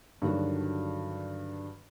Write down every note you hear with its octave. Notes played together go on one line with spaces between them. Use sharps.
G2 D3 D#3 F#3 F#4